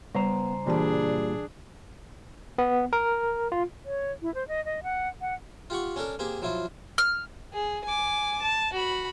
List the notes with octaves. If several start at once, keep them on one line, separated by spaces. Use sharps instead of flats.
C#3 G3 B3 C5 A#5
A#2 E3 G3 D4 G#4 A5
B3
A#4
F4
C#5
E4
C5
D#5
D#5
F#5
F#5
F4 G4 F#5 C#6
C#4 D4 A4 A#4
A#3 C4 G4 G#4
F3 F#3 E4 F4
F6
G#4
G#5 D6
A5
F#4 B5